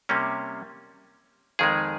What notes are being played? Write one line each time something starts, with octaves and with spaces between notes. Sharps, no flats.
C3 G3 A#3 C#4
F2 D#3 G#3 G#4